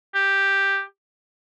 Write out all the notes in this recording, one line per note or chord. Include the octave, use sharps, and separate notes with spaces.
G4